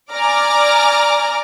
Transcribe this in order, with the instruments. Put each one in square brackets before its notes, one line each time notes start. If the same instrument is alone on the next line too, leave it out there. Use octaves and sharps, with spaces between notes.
[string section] D5 G#5 A#5 D6 F6